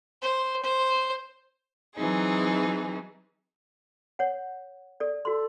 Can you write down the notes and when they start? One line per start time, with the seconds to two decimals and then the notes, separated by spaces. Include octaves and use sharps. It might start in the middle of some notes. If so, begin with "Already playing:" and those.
0.22 C5
0.63 C5
1.95 E3 F#3 C4 D#4 G#4
4.19 C#5 F#5
5.00 A4 D5
5.25 F#4 A4 C6